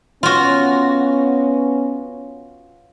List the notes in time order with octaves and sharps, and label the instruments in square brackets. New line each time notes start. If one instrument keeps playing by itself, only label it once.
[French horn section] B3 C#4 [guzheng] F4 F#4